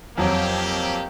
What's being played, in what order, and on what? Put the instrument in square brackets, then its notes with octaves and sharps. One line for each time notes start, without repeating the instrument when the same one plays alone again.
[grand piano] F2 F#3 [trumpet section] A#3 G4